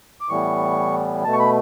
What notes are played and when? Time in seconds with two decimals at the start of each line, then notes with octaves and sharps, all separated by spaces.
0.21 D6
0.29 A2 E3 G3 B3 C#6
1.24 B2 A3 A5
1.33 C#6
1.39 B5